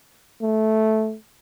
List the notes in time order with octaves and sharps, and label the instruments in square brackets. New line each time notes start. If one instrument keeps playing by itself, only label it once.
[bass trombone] A3